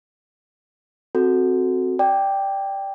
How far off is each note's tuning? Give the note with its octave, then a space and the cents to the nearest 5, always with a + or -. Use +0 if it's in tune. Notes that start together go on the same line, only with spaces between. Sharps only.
C4 +0 F#4 +0 A4 +0
D5 +0 G5 +0